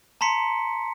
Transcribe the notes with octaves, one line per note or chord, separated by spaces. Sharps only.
A5 A#5 C6 B6 C#7